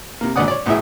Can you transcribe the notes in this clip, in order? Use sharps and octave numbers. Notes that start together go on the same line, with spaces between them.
C3 A#3
G#1 A#2 D3 D5 F#5 D#6
C#5 D5
B1 A2 E4 G#4 E5